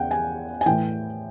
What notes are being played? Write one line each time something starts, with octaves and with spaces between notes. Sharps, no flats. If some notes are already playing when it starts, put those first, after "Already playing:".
Already playing: E2 C#3 F#5 G5
G#5
G#5
A2 E3 G5